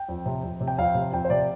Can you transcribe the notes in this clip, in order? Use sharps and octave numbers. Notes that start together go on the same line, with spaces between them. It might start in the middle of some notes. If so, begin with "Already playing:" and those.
Already playing: G5
F2
C3
F2
C3
G5
F2 F5
C3
F2 G5
C5
C3 D5